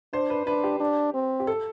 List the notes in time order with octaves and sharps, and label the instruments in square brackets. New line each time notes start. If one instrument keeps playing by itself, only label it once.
[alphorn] D4 [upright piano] C5
[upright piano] B4
[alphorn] D4 [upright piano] B4
[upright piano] G4
[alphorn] D4
C4
[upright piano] G4
A4